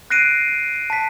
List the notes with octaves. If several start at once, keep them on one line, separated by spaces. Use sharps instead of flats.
F#6 A#6 C7 D7 D#7
A5 B6